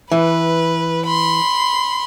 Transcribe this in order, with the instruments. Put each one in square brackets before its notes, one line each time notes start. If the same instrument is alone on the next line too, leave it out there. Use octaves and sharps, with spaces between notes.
[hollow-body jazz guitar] E3 [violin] B4
[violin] B5 C6